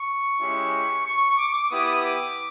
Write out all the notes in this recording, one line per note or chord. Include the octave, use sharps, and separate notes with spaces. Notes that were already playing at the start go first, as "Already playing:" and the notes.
Already playing: C#6
G#3 C#4 E4 G4
C#6
D6
B3 E4 G4 D#6
D6